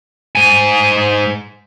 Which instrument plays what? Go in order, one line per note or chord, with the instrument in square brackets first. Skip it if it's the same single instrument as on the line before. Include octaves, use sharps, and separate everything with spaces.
[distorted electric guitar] G#2 G#5